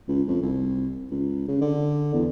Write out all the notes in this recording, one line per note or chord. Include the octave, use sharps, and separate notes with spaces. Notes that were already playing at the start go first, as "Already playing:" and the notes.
C#2
F2
C2
C#2
C#3
D3
E2